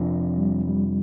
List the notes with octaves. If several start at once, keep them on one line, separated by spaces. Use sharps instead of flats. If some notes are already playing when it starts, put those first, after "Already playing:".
Already playing: F2 C3 F3 D4
G3
G3